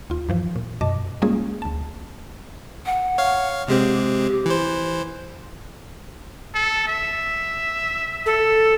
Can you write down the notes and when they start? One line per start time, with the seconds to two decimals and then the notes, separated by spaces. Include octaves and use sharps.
0.10 D#2 F4
0.29 G2 E3 F3
0.56 A#2
0.81 F#2 B2 D#5 A5 D6
1.22 G3 G#3 A#3 C#4 F4 G#4
1.62 D2 A5
2.86 F#5
3.18 C#5 F5
3.68 C3 G#3 C4 G4
4.46 E3 C5
6.55 A4
6.87 E5
8.26 A4